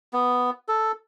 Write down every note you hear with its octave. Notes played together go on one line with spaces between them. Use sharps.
B3
A4